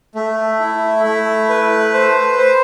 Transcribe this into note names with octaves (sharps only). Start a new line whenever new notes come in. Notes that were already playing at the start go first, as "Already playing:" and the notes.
A3
E4
A3
B4
C5
C5